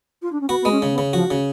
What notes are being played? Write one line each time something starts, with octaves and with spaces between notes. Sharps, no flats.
F4
D4
C#4
B3 F#4
G#3 B3
C#4
C#3
B3
C#3
F3 F#4
C#3